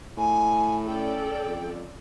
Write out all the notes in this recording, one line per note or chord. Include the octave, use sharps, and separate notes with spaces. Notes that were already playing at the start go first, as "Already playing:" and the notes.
A2 G#5
C#4 A4 D5 G5
F2